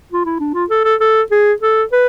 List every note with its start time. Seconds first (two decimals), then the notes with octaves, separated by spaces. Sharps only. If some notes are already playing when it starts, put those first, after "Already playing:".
0.12 F4
0.26 E4
0.40 D4
0.54 F4
0.70 A4
0.84 A4
1.01 A4
1.31 G#4
1.62 A4
1.92 B4